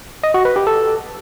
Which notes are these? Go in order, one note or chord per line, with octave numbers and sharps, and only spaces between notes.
D#5
F#4
B4
G4
A4